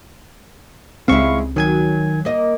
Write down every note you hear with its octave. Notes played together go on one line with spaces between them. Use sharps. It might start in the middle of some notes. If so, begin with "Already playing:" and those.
C#2 C#3 G#3 C4 E4 F5 C#6
D#3 F#3 G#5 G#6
A#3 D#5